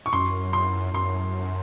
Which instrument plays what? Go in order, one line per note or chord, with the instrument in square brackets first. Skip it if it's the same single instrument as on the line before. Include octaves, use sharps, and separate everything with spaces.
[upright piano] C#6
[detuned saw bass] F#2 [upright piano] C6
[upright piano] C6
[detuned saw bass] F#2 [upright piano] C6